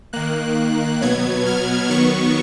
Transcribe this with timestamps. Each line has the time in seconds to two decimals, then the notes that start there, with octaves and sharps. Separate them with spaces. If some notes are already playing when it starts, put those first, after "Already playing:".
0.13 D#3 A#3 F#6
1.01 B2 F#3 B3 G#6
1.46 F6
1.89 D#3 F#3 B3 C#6